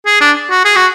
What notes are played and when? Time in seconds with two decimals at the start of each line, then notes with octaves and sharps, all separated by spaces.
0.06 G#4
0.21 D4
0.50 F#4
0.65 G#4
0.76 F#4